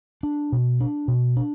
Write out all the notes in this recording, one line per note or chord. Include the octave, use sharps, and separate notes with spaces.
D4
B2
D4
B2
D4